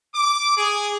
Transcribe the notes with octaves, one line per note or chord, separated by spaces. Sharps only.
D6
G#4